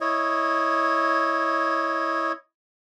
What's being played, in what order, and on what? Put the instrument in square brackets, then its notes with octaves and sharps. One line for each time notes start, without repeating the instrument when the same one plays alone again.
[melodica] E4 C#5 D#5